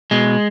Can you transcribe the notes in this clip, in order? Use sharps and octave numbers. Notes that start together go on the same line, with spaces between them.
B2 G#3